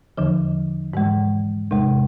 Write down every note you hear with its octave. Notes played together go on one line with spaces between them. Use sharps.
E2 D3 F3
G#2 E3 G#3
E2 C3 G#3